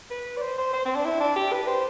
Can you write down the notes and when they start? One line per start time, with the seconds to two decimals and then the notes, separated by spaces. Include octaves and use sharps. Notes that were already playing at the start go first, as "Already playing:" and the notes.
0.11 B4
0.37 D5
0.42 C5
0.58 C5
0.73 C5
0.85 C4
0.95 D4
1.05 E4
1.20 D4
1.36 G4
1.52 B4
1.67 C5